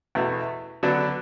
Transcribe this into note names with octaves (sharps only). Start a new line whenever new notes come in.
E2 B2 A3
D3 F#3 B3 D4